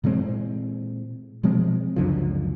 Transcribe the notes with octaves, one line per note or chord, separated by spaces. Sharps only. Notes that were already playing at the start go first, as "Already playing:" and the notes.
A#2 E3 G#3 C4
B2 F3 G#3 C4
C#2 F#2 D3 F3